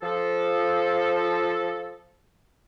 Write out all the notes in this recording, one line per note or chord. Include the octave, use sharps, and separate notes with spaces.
F3 A4